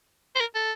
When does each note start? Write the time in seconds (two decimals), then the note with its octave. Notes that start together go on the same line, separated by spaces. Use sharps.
0.35 C5
0.40 A#4
0.55 A4